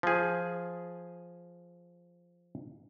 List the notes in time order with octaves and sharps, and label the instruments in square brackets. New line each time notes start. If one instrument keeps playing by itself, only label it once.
[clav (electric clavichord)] F3 G#4